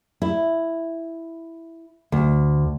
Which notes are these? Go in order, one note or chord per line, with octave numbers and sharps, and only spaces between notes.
E4
D2